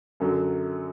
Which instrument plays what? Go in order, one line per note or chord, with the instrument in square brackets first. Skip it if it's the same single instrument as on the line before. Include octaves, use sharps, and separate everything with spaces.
[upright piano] F#2 D3 F#3